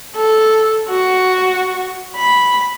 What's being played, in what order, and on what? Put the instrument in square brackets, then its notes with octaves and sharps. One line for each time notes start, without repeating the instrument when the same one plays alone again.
[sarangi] A4
F#4
B5